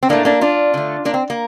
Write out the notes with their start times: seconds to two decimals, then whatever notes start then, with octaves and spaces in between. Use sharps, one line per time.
0.03 C4
0.09 A2 A3 A#3 D4
0.25 A#3 D4
0.41 D4 F4
0.74 D3 A3
1.05 A#3 D4
1.14 C4
1.30 A#3